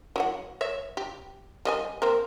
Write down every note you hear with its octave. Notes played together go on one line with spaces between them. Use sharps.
F#3 E4 F#5
C#5 E5
G4
G3 D#5 G#5
A#3 C4 A#4